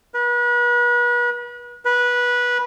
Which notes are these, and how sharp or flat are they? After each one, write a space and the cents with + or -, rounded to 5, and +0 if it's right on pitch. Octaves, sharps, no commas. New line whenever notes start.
B4 -35
B4 -15